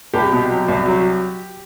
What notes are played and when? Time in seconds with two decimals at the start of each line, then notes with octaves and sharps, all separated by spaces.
0.14 C2 G4
0.32 B2
0.50 F#3
0.68 C2
0.86 F#3